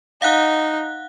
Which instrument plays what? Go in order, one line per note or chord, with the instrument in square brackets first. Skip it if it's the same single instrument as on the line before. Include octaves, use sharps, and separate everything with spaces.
[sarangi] D#4 [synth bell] F5 F#5 F#6